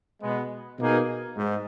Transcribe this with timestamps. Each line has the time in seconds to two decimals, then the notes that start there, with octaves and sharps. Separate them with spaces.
0.23 B2 G#3 B3
0.80 B2 A#3 D#4 G#4
1.37 G#2